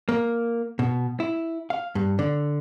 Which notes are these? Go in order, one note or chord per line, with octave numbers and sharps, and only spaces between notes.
A#3
B2
E4
F5
G2
D3